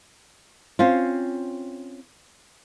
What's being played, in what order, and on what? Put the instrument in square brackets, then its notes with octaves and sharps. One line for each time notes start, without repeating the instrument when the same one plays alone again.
[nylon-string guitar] C4 C#4 F4